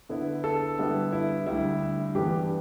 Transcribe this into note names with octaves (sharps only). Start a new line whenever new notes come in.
D3 B3 E4
A4
D3 G3 B3 E4
E4
D2 D3 G3 E4
G2 E3 B3 D4 G4